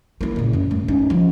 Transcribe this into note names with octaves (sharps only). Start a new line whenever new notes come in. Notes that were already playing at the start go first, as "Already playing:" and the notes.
A#3 E4
A#2 C#3
F#2
A3
C#4 D#4
F3